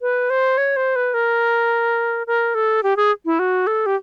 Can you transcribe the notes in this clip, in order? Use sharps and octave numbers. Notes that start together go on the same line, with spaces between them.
B4
C5
C#5
C5
B4
A#4
A#4
A4
G4
G#4
E4
F#4
A4
G4